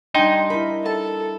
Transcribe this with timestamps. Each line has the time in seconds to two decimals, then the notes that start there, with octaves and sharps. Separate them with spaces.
0.15 G3 D4 D#4 G5 G#5 C6
0.50 E4 A#4 B5
0.86 A4 A5